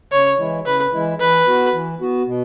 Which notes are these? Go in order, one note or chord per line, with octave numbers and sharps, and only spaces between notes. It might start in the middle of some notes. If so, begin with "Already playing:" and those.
C#3 C#5
E3 G#3 E4
C#3 B4
E3 G#3 E4
E3 B4
B3 F#4
E3
B3 F#4
B2